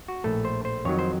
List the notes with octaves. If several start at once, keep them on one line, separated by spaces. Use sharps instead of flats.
F#4
A#1 A2 A3 A4
C5
C5
F2 D#3 F#3 C#5
C5